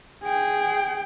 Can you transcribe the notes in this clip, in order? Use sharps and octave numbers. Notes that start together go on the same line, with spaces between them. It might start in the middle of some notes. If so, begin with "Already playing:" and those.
G#4 G5